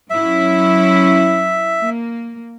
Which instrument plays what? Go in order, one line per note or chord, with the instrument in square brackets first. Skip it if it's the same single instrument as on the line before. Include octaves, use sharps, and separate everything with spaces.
[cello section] F#3 C#4 E4 [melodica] E5
[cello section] A#3